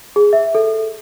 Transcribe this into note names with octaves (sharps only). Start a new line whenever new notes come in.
G#4
E5
A4